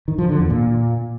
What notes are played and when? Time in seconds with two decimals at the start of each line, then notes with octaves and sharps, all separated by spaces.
0.08 D#3
0.18 F3
0.29 D3
0.40 E2
0.50 A#2